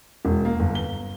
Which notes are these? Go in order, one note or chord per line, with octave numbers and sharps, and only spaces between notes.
E1
A#3
G1
G7